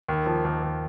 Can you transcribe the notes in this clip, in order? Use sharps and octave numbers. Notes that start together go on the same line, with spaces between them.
D#2
F3
D#2
D#2